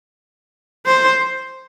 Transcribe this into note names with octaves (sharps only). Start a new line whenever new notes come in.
C5